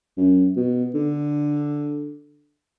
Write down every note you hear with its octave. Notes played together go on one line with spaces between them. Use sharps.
F#2
B2
D3